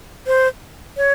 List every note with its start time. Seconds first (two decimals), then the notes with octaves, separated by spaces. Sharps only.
0.27 C5
0.97 C#5